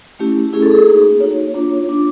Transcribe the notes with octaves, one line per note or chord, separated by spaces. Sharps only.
A3 C#4 E4 G4
A3 C#4 E4 G#4
A4
G#4
A#3 D#4 F#4
A#3 D#4 F#4 C#5
A#3 D4 F4 C#5
A#3 D4 F4